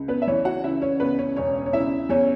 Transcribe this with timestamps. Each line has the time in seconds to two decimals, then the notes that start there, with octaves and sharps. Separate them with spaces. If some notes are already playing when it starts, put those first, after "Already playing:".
Already playing: C#2
0.08 B3 B4
0.22 E5
0.27 E3 C#4 C#5
0.45 F#4 F#5
0.63 C#3 E4 E5
0.82 C#4 C#5
1.00 C#2 B3 B4
1.18 C#4 C#5
1.36 E1 C#4 C#5
1.66 C#5
1.73 C#3 E4 E5
2.09 E2 C#4 C#5